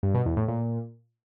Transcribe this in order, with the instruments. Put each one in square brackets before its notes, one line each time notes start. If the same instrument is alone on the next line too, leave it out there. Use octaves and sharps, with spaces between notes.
[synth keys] G2
B2
E2
A2
A#2